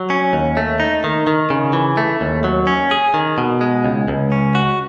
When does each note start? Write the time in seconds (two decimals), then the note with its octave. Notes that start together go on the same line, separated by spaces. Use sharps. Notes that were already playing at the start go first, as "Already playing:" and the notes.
Already playing: F#3
0.10 C#4
0.33 D#2
0.57 A3
0.80 D#4
1.04 D#3
1.27 D#3
1.50 C#3
1.73 E3
1.97 A3
2.21 D#2
2.44 F#3
2.67 C#4
2.91 G#4
3.14 D#3
3.38 B2
3.61 G#3
3.85 C#2
4.08 C#2
4.32 C#4
4.55 F#4